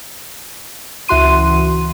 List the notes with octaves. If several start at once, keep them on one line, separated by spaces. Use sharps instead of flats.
C#2 E3 F#4 C6 D#7